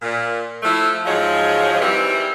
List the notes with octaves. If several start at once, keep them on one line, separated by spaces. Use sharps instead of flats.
A#2
F3 A3 E4
G#2 F3 F#3 G#3
D#3 E3 G3 C4